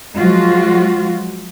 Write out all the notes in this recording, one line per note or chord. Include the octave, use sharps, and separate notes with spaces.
F3 F#3 G#3 F4 F#4